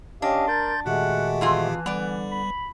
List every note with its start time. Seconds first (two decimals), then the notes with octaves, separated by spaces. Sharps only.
0.22 C#4 D4 G4 D#5 F5
0.48 A#4 D5 C6 G6 A6
0.86 A#2 D#3 G#3 A3 F#4 G4 F#5
1.41 F2 E3 F4 G#4
1.86 D3 G3 B3 D5
2.31 B5